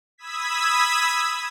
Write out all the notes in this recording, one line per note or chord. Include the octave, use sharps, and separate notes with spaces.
B5 D#6 E6 G#6 B6